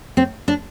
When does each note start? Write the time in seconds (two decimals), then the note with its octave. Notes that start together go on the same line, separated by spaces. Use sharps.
0.17 C4
0.48 D4